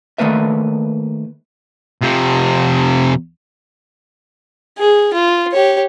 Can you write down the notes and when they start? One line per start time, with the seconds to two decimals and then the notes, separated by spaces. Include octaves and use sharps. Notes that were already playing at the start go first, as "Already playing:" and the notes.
0.18 D#3 A3 A#3 B4 E5
2.01 F2 C3
4.79 G#4
5.14 F4
5.53 G4 C#5